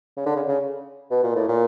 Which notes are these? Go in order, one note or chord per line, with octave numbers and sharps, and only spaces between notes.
C#3
D3
C#3
C#3
B2
A#2
A2
A#2